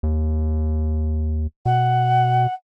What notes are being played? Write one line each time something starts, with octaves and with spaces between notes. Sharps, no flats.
D#2
B2 F#5